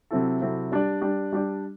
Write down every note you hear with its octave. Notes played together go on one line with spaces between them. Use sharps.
C3 F#3 C4 E4 A4
C3 F#3 C4 E4 A4
G3 D4 G4 D5
G3 D4 G4 D5
G3 D4 G4 D5